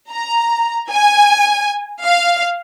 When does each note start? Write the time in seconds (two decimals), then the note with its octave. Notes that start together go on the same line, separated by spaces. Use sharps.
0.10 A#5
0.92 G#5
2.05 F5